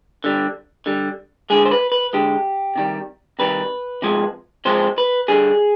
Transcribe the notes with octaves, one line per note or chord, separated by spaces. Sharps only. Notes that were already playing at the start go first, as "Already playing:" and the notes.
D3 G3
D3 G3
D3 G#3 G#4
C5
B4
B4
D3 G#3 G4
C3 D#3 G3
C3 D#3 G3 B4
C3 F3 G#3
C3 F3 G#3 C5
B4
D3 G3 G#4